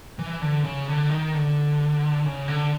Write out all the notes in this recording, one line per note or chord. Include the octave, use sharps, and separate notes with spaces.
E3
D3
C#3
D3
D#3
D3
C#3
D3